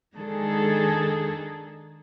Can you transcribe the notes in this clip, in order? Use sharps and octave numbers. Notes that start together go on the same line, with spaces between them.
D#3 G#3 D4 G#4 A4